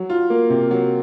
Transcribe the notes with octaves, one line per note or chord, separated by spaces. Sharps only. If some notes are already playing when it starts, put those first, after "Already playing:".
Already playing: F#3
F4
A#3
C3
F#3